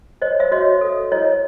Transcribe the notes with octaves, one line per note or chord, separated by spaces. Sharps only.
C5 C#5 D#5
E5
F#4 C#5 D#5
A4
E4 C#5 D#5